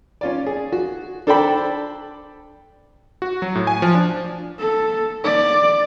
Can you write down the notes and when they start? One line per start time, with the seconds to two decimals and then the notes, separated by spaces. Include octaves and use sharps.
0.21 C#4 F4 D5
0.46 G#4
0.72 F#4
1.27 D4 A4 C5 D5 G5 B5
3.22 F#4
3.42 F#3
3.55 A2
3.67 G#5
3.82 F3
3.95 D4
4.60 A4
5.24 D5